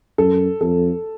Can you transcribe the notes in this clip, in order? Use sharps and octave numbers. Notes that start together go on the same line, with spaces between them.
F#2 A4
F2 A4